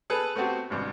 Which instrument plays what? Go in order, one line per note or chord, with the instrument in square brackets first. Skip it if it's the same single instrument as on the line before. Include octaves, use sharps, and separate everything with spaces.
[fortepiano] G#4 A4 B4
A3 B3 C4 F#4 G4
G#1 G2 C3